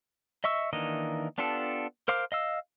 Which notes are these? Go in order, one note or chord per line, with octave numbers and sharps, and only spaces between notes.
D#5 E5 C#6 E6
D#3 E3 A#3 D4 D#5
B3 D4 F4 G4 A4
A#4 C5 F5 D6 F6
D#5 F5 E6